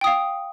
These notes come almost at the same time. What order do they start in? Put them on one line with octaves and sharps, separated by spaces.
G5 D#6 F5